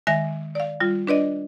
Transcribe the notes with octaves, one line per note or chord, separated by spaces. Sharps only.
D#3 G#3 E5 G#5 A#6
D5 F5
G3 F4
D4 B4 D5 D#5